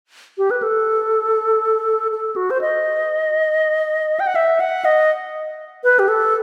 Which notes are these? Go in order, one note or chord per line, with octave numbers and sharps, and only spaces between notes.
G4
B4
A4
A4
F#4
C5
D#5
G5
F#5
E5
F#5
D#5
B4
G4
A4